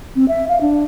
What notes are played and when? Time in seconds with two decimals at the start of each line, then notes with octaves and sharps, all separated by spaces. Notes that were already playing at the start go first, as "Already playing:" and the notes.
0.16 C4
0.28 E5
0.49 F5
0.61 D4